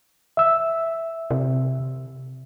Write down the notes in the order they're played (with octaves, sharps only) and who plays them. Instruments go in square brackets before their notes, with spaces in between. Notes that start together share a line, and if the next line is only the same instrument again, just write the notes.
[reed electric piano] E5 E6
[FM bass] C3